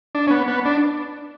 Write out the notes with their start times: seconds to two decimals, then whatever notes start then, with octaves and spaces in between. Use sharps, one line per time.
0.15 D4
0.27 C#4
0.31 B3
0.48 B3
0.65 D4